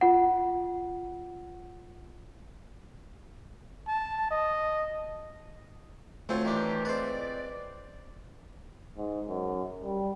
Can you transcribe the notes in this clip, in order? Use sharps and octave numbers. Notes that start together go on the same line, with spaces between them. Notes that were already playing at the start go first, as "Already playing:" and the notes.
F4 F#5
A5
D#5
D2 A3 C4 F4 C#5 G5
D#3 E3 D4 G4
G#3 C4 B4 C5 D5
G#2
F#2
G3